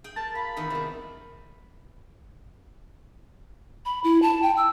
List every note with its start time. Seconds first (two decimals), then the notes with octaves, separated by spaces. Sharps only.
0.04 G#4 G5
0.16 A#4 A5
0.35 F4 B5
0.57 E2 D#3 G#4
0.70 C3 G3
3.85 B5
4.04 E4
4.22 A5
4.42 G5
4.57 E6